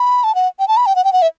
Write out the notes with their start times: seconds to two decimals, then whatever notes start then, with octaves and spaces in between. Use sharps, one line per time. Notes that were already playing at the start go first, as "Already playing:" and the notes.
Already playing: B5
0.24 A5
0.35 F#5
0.59 G5
0.68 A5
0.77 B5
0.86 G5
0.96 F#5
1.04 G5
1.13 F#5
1.22 E5